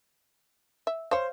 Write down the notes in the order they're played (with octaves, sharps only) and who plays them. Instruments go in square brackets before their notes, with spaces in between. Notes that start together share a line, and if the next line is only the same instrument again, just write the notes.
[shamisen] E5
[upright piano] C5 [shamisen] C#5 F5